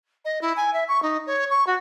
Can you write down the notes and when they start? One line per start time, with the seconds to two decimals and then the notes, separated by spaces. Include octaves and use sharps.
0.25 D#5
0.42 E4
0.57 G#5
0.73 E5
0.88 C#6
1.03 D#4
1.27 C#5
1.50 C#6
1.67 F#4